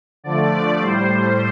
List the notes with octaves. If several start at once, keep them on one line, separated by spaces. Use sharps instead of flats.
D3 F3 A3 D5
D5
A2 G3 C5
C5